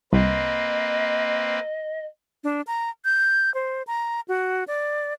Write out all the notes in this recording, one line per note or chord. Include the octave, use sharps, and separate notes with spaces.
C2 A#3 C4 B4 D#5
D4
A#5
G6
C5
A#5
F#4
D5